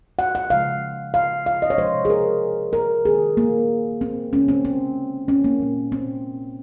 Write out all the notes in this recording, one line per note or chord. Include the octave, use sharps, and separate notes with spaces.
F#5
F#5
C#3 F3 G#3 F5
F5
F5
D#5
C#5
C3 F3 G#3 C5
G#4
A#4
A#4
D#3 F#3 A#3 G#4
A#3
C4
C#3 G#3 C#4
C4
C4
C#4
A#3
A#2 F#3 A#3
C4